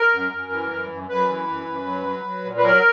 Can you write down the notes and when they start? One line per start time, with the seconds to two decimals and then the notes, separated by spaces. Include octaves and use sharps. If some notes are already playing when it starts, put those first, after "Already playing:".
Already playing: A#4
0.13 F#2
0.32 F#2
0.52 E3
0.71 F#2
0.90 F#2
1.09 F#2 B4
1.29 E3
1.48 F#2
1.67 F#2
1.86 F#3
2.05 F#3
2.24 F#3
2.44 A#2
2.58 B4
2.63 F#3 A#4